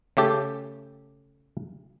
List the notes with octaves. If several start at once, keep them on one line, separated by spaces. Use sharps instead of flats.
C#3 A3 G4 A4